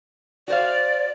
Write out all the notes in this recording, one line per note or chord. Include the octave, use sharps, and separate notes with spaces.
F#4 C5 D5 F5